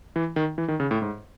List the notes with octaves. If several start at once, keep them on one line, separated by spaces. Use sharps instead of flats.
E3
D#3
E3
D#3
C#3
A2
G#2